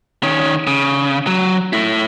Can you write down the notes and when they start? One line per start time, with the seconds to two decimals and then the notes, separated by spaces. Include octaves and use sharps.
0.23 D#3 C#4
0.67 C#3
1.27 F#3
1.73 A3 E4